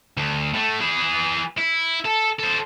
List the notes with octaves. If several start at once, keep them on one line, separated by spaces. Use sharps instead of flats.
D2
A2 A3
E3 G#4
E4
A4
A4 C5